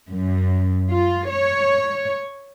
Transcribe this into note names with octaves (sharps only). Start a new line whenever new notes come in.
F#2
F4
C#5